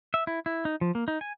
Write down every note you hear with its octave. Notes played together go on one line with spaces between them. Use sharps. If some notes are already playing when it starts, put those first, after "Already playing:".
E5
E4
E4
D#4
F3
A#3
D#4
G#5